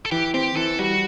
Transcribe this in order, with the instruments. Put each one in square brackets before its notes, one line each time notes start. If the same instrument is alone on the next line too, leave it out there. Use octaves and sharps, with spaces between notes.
[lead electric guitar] A4
[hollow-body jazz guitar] E3 [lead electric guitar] G4
[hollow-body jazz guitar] C4 [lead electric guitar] G4
[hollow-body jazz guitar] E3 [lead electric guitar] A4
[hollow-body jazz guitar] G3 [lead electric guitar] F#4